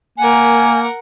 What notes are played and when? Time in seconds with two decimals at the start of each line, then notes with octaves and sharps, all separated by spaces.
0.18 A#3 A#4 F#5 G#5